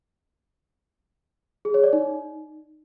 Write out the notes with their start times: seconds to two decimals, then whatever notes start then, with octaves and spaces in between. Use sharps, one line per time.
1.65 G#4
1.74 C#5
1.84 D5
1.93 D#4